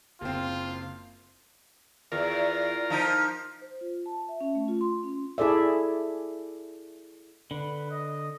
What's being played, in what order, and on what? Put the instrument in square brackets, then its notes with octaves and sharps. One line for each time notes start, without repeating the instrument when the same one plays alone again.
[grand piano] F#1 C4 [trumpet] F4
[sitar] E2 [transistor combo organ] F4 A#4
[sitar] F3 D#4
[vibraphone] C5
F4
A5
E5
C#4
A3
F4
C6
C#4
[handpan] E4 G#4 A4 D5 E5
[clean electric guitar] D3 [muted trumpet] B4
[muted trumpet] D#5